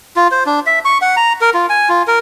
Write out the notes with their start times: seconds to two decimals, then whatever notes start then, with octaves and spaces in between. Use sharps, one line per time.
0.16 F4
0.32 C5
0.46 D4
0.66 E5
0.85 C#6
1.02 F#5
1.16 A#5
1.41 A#4
1.54 F4
1.69 G#5
1.89 F4
2.07 A#4